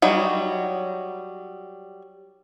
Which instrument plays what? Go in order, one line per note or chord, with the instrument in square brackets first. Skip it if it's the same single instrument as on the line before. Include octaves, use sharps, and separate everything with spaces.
[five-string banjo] F#3 G3 D#4